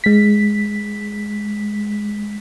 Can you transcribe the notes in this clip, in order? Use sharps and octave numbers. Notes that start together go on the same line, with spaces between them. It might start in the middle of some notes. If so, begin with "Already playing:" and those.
G#3 B6